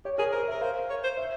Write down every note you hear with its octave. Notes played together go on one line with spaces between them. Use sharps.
G4 C#5
G#4 A#4
A#4 C5
A#4 E5
C5 F5
C#5
C5
E5